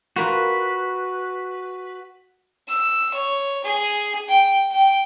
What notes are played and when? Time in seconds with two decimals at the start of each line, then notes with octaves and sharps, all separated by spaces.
0.16 F4 F#4 A#4 B4
2.69 E6
3.14 C#5
3.64 G#4
4.28 G5
4.71 G5